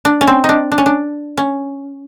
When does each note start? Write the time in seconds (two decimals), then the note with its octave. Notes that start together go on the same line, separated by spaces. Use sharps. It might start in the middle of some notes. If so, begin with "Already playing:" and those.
0.05 D4
0.21 C#4
0.27 C4
0.44 D#4
0.49 D4
0.72 D4
0.78 C#4
0.86 D4
1.37 C#4